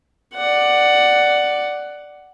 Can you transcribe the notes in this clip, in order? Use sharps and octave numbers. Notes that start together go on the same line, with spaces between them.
D5 F#5